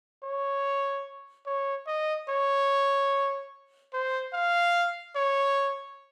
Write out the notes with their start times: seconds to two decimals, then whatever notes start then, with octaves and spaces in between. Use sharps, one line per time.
0.23 C#5
1.46 C#5
1.87 D#5
2.29 C#5
3.93 C5
4.33 F5
5.15 C#5